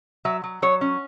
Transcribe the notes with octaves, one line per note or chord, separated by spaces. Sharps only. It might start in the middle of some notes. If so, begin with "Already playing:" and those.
F#3 E5
F#3
F#3 C#5
C#4